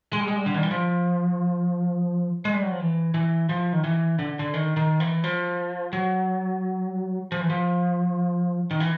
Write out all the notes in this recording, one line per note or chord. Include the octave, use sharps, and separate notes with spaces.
G#3
G3
G#3
G3
D3
D#3
E3
F3
G#3
G3
F#3
F3
E3
E3
F3
D#3
E3
D3
D3
D#3
D#3
E3
F3
F#3
F3
E3
F3
D#3
E3